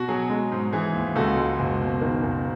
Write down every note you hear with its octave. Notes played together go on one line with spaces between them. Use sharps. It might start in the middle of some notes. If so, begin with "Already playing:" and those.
Already playing: B2 F#4
F#3 G#4
G#3
G#2
E3 G#4
D#2
C#2 F#4 A4
G#3
F#1
B2
D#3
F#1